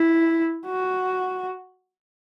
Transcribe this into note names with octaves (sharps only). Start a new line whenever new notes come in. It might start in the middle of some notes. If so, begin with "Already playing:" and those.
Already playing: E4
F#4